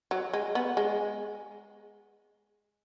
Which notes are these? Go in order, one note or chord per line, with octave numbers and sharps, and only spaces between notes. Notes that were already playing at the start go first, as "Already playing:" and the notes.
F#3
G#3
B3
G#3